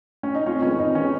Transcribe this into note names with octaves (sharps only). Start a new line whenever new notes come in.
C#4
D#4
F2 C#4 F4
D#3 G#3 B3 C#4
F2 D#4
D#3 G#3 B3 C#4